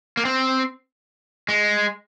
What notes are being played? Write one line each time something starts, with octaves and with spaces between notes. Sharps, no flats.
A#3
C4
G#3